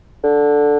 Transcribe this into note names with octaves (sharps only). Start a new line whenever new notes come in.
D3